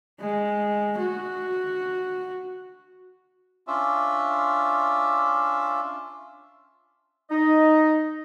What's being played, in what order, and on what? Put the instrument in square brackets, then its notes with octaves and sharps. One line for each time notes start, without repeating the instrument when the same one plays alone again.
[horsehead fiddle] G#3
F#4
[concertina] C#4 D4 F4 E5
[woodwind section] D#4 D#5